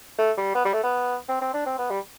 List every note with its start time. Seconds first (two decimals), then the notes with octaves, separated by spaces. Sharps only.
0.19 A3
0.37 G3
0.55 B3
0.65 G3
0.73 A3
0.83 B3
1.29 C4
1.41 C4
1.54 D4
1.66 C4
1.79 B3
1.90 G3